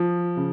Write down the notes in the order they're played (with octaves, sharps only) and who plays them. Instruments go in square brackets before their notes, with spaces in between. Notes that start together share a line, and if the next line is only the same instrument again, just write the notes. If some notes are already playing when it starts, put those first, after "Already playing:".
Already playing: [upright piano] F3
C#3